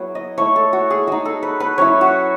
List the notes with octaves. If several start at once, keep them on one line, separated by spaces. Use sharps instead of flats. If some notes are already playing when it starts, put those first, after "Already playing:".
Already playing: F#3 B3 E4 G#4 C#5
D#5
A3 E4 C#5
A4
F#4
G#4
G#3 D#4 F#4
A4
B4
B4
F#3 C#4 E4 C#5
F#4